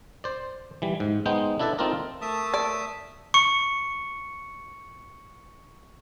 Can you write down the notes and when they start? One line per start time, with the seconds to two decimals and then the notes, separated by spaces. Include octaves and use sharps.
0.24 C5 D5
0.82 E3 G3
1.00 G#2
1.26 G#3 B3 D#4 C5 G5
1.59 D4 E4 A4 B4 D5
1.78 C4 D#4 F4 A4 A#4 D5
2.22 A3 A#4 E5 A5 D#6
2.54 D5
3.34 C#6 C#7